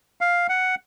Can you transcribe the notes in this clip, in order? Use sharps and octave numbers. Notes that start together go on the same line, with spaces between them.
F5
F#5